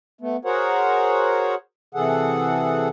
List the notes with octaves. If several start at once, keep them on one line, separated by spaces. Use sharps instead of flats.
A3 B3
F#4 G#4 A#4 C5 C#5 F#5
C3 E3 G#4 A4 F#5